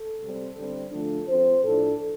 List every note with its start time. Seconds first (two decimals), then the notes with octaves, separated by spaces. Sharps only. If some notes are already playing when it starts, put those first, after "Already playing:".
Already playing: A4
0.20 C3 G3 C4
0.57 D3 G3 C4
0.92 D3 F3 A3 D4 A4
1.28 F3 C4 C5
1.64 A2 F3 D4 A4